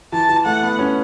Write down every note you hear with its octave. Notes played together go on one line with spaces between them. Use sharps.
E3 A5
E3
A3 F#5
B3
C#4